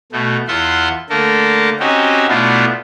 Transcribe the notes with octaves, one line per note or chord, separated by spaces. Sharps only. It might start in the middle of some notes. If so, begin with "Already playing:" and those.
B2 A3
E2 F4 E5 F#5 C6
D3 A3 A#3 A4 A#4
C4 C#4 D#4 F#4 G4
B2 A3 B3 D4 E4 F4